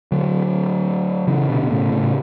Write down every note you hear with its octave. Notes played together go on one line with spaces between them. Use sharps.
D3 F#3
C#3 E3
B2 D3
B2
A2 C#3
A2 C#3